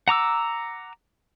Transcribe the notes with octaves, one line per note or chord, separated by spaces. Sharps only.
F#5 A#5 D6 E6